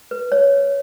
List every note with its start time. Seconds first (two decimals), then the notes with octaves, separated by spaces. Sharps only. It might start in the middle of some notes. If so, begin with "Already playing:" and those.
0.11 B4
0.32 C#5